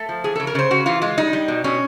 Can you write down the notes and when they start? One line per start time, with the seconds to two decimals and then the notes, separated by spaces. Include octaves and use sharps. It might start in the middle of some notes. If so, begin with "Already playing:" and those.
Already playing: A3 A4
0.09 F3
0.24 E3 G#4
0.35 C#3 A4
0.47 A#4
0.55 C#3 C5
0.70 C#3 F#4
0.86 E3 F4
1.02 G#3 F4
1.18 G3 D#4
1.33 G3
1.48 B2
1.64 B2 C#4